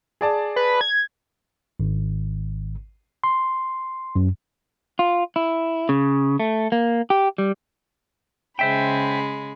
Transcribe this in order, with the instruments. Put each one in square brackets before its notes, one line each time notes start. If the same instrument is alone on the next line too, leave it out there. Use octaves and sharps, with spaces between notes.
[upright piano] G#4 D5 A5
[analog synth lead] B4
G#6
[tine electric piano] G#1
C6
F#2
[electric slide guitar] F4
E4
C#3
A3
A#3
G4
G3
[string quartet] C#3 G#3 B5 [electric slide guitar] C5 E5 G5